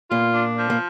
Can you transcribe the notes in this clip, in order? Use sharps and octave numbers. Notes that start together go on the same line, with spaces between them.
A#2 A#3 F4
D4
F3
A#3